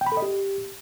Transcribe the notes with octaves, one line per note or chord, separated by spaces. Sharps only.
G5
B5
A4
D#5
G4